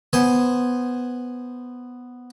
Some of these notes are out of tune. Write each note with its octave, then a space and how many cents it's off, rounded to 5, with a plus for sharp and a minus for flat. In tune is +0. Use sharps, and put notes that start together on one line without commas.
B3 +0 C5 +0 G#5 +0